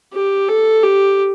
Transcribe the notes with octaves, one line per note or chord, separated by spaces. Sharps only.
G4
A4
G4